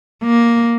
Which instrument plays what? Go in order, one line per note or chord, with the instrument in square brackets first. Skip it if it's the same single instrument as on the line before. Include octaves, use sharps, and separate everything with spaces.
[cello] A#3